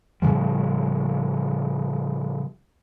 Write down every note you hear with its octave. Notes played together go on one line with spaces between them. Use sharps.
A2 C#3 F3 G3